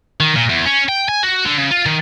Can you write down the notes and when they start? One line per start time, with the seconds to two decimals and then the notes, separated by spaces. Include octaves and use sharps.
0.20 D#3
0.36 A#2
0.49 E2
0.66 C#4
0.89 G5
1.09 G#5
1.23 F#4
1.45 D3
1.58 C#3
1.71 F4
1.86 D#3